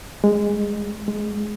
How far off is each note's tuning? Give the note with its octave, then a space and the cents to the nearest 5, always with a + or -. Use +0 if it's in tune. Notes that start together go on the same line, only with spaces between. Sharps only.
G#3 -15
G#3 +5